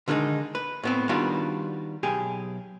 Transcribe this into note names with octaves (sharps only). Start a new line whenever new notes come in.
D3 D#3 G#3 D4 D#4
B4
A2 B3 C4
D#3 G3 B3 D4 F4 F#4
B1 G4 G#4